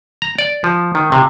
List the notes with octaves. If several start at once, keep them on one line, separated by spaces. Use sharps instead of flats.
A#5
D5
F3
D#3
C3